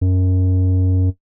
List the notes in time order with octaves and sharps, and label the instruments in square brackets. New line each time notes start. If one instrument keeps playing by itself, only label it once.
[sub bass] F#2